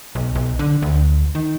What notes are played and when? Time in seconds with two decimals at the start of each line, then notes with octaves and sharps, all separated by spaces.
0.15 B1
0.35 B1
0.59 D3
0.82 D2
1.35 D#3